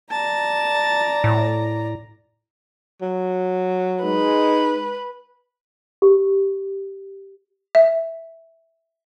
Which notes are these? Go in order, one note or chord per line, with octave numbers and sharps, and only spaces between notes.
D5 A5 A#5
A2
F#3
G#3 D#4 B4
G4
E5